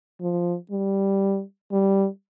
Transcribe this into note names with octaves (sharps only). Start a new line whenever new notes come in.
F3
G3
G3